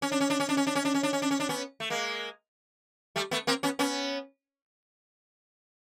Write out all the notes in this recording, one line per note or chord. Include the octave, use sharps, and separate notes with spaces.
C#4
D4
C#4
D4
C#4
D4
C#4
D4
C#4
D4
C#4
D4
C#4
D4
C#4
D4
B3 C#4
A3
G#3 A#3
G3 A3
A3 B3
A#3 C4
B3 C#4
B3 C#4